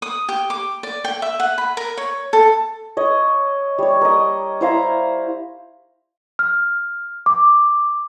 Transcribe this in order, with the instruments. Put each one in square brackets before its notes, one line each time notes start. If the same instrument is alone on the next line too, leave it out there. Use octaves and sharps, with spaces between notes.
[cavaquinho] D#6
G4
D6
D5
G5
E5
F#5
B5
A#4
C#5
A4
[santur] C#5 D#5
G3 C#5
A#4 D#5
E4 C5 F5 A#5
[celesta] F6
D6